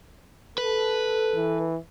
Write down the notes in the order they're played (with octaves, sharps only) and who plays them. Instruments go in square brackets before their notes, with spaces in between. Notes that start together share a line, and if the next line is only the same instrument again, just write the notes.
[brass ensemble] A4 [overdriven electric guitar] B4
[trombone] E3